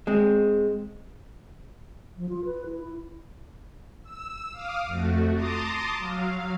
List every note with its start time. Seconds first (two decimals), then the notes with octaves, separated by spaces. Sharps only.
0.07 G#3 C4
2.16 F3
2.29 F4
2.45 B4
2.66 E4
2.82 E4
4.03 E6
4.52 F5 D6 D#6 F6
4.86 F2 A3 F#4
5.34 A5 A#5 C6 D6 D#6
5.97 F#3 F5